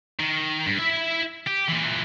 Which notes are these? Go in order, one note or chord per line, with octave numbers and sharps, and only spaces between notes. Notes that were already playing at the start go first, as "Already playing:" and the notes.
D#3
G2
E4 E5
G4
A#2 E3